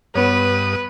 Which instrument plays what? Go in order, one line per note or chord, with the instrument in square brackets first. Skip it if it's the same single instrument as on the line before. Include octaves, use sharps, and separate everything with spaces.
[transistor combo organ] G2 D#6 [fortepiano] B3 C#5 [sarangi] B4